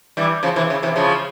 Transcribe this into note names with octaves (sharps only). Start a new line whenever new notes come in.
E3 G3
C#3 F3
C3 E3
C#3
C3 E3
C#3 F3